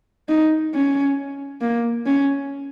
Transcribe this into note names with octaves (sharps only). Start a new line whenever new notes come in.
D#4
C#4
A#3
C#4